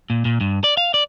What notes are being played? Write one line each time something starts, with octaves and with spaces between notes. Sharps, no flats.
A#2
A#2
G2
D5
F5
D5